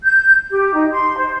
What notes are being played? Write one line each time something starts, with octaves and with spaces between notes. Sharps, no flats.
G6
G4
D#4
C6
C5